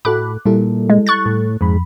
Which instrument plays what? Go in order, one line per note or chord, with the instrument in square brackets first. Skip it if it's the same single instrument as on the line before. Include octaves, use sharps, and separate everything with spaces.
[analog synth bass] A2 [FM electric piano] F#4 A4 B5 [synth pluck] D6 F#6
[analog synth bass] A#2 [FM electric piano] G3 E4 A4
[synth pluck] G#3
C#6 F#6 A6
[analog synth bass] A2
[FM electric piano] F2 B5 [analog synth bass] G#2